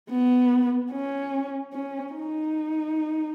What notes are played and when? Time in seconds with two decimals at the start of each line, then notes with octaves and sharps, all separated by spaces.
0.11 B3
0.92 C#4
1.73 C#4
2.13 D#4